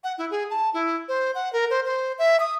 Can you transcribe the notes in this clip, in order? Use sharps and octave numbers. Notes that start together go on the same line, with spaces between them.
F#5
E4
G#4
A5
E4
C5
F#5
A#4
C5
C5
E5
D#6